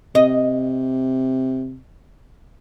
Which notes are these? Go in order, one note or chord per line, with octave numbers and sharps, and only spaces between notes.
C3 D#5